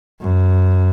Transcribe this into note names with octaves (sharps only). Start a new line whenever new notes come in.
F#2